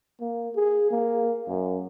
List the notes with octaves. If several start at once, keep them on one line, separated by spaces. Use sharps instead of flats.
A#3
G#4
A#3
F#2